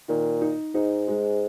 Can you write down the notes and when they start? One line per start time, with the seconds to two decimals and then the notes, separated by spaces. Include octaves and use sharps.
0.08 A#2 D#3
0.41 D#4
0.74 G#2 D#4
1.08 G#3